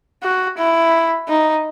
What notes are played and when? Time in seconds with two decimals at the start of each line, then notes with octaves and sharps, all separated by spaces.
0.23 F#4
0.58 E4
1.28 D#4